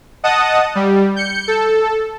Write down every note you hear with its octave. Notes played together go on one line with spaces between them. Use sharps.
D#5 F#5 A5 D#6
G3
G6 C#7
A4